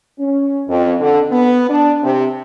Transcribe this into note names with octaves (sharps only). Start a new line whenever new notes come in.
C#4
F2
D3
B3
D4
C3